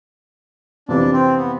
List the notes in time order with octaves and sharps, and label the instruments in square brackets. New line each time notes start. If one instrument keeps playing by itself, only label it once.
[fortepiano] F2 C3 E3 [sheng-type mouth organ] D4
[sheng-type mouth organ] C4
B3